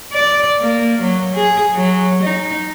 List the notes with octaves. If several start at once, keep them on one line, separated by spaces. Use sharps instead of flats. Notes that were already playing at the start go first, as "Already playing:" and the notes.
D5
A#3
F#3
G#4
F#3
D#4